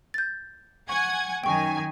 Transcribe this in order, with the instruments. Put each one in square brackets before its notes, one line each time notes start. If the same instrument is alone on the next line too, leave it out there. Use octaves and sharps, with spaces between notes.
[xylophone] G6 A6
[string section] F#5 G#5 G#6 [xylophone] C#6
[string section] F#2 D#3 G#5 [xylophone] G5 C#6